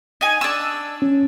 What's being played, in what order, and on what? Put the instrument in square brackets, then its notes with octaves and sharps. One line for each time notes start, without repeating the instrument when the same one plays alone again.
[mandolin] D#4 G#5
D4 E6
[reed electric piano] C#4